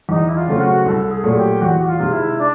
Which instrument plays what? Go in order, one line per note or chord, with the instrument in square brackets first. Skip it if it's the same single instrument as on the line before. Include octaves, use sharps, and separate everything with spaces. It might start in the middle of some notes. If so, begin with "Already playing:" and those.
[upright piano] E2 [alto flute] D#4
[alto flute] E4
F4
[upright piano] C#3 F#3 A3 C4
[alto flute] F#4
[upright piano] C2 [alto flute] A4
[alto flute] G#4
[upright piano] A#2 F#3 A3
[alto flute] G4
[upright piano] E2 [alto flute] F#4
[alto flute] F#4
F4
[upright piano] C3 D#3 G#3
[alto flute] E4
D4